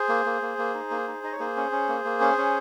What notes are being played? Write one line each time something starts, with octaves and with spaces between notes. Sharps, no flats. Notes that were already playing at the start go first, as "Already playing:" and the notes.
Already playing: G#4 C5
A#3
A#3
A#3
A#3
D#4
A#3
D#4
D#4 D#5
C#5
A#3 G#4 C5
C#4
C#4
A#3
A#3
C#4
C#4